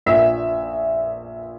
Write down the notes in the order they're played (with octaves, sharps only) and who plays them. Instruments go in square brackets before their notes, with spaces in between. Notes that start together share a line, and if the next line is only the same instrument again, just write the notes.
[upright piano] A#1 A#2 E5